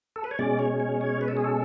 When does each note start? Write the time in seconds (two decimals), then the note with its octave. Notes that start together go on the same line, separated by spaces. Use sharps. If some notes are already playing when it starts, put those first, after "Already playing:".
0.16 A4
0.24 B4
0.31 C#5
0.39 B2 G#3 C#4 D5
0.59 C#5
0.80 C#5
1.01 C#5
1.21 B4
1.28 A4
1.37 G#4
1.44 A4